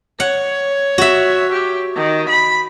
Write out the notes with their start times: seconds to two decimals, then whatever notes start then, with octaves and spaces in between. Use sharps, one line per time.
0.20 C#5 F#5
0.98 F#4 E5
1.52 G4
1.96 D#3
2.29 B5